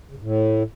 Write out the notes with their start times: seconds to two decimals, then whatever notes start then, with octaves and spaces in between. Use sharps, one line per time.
0.11 C#3
0.16 G2
0.21 A2